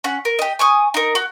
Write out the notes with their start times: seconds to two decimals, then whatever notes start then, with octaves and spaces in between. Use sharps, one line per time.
0.04 C#4 F#5
0.25 A#4
0.39 G4 D#5
0.59 G#5 C#6 D#6
0.94 D#4 A#4
1.15 F#4